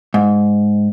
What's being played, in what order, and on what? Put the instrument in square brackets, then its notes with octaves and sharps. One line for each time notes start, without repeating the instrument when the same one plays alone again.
[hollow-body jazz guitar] G#2